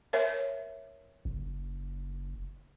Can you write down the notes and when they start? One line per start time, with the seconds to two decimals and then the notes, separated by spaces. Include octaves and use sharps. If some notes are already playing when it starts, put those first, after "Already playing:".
0.13 A#4 C#5 E5
1.25 F#1